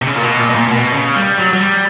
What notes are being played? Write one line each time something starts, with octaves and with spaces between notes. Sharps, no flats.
C3
C#3
A#2
B2
A#2
B2
A#2
A#2
B2
C#3
G3
F#3
F#3
G3